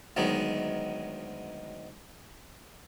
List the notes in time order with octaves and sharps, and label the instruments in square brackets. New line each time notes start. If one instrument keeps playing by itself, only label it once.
[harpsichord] D2 D#3 F#3 G#3 B3